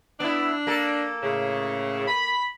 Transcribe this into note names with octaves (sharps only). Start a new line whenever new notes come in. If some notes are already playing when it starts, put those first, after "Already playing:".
B3 D4 E4
A#3 A4
A2 C#3
B5